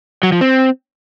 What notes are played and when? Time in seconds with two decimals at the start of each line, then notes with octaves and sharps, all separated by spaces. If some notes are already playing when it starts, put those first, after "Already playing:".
0.23 F#3
0.32 F3
0.41 C4